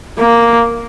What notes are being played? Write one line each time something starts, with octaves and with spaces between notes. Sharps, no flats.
A#3